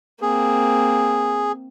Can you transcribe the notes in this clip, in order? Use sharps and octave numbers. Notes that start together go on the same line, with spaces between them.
A#3 C4 G#4